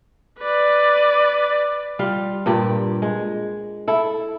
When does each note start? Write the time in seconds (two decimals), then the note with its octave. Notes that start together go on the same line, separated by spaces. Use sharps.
0.39 B4 D5
1.99 G3 F4 F5
2.46 G2 A#2 G4 D5
3.02 G#3
3.88 E4 A4